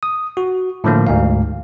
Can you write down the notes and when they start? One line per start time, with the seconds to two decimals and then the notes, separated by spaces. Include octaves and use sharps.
0.03 D#6
0.37 F#4
0.84 A2 D3 F3 A#3
1.07 D2 G#2 F5